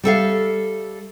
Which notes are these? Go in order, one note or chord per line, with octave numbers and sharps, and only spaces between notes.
G3 A4 E5 F5